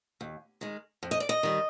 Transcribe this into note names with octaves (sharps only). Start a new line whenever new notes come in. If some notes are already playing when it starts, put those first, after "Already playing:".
D#2
D#3 G#3
F2
D#5
D5
D#5
D#3 G3